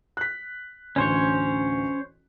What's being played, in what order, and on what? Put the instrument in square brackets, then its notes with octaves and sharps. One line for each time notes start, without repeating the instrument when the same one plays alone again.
[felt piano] F#6 B6
[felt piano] A1 D2 [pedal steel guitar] C#4 C5 C#5